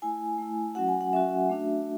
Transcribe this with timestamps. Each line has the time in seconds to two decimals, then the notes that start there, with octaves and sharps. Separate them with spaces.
0.02 A3 E4 G#5
0.38 A3 E4
0.75 F#3 C#4 F#4 F#5
0.88 G#5
1.01 F#5
1.13 F#3 C#4 F#4 E5
1.49 A3 D4 F#4